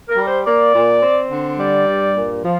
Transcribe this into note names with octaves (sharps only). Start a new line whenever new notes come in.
A#4
G3
C5
A#3 D5
A#2
C4
D3
G3 D5
G2
A#2
F3